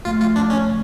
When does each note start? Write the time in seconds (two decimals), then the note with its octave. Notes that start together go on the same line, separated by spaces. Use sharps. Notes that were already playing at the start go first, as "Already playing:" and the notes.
0.05 F#2 F3 A3 F4
0.21 F4
0.36 D4
0.50 C#4